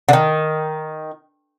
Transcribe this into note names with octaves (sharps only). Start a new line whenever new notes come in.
D3
D#3